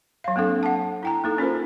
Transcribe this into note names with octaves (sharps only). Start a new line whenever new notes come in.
F#3 F5
A#3 C4 D4 A4
F#5 A5
E4 G5 A#5
A#3 D#4 A4
C#4 F4 A#4 C5